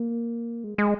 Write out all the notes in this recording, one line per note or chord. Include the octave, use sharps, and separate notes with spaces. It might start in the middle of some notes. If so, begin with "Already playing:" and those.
Already playing: A#3
G#3
G#3